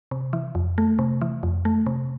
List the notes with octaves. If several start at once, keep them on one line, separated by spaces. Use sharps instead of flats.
C3
E3
F2
A3
C3
E3
F2
A3
C3